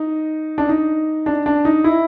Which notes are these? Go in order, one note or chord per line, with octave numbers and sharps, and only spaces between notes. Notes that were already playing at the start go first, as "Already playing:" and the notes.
Already playing: D#4
D4
D#4
D4
D4
D#4
E4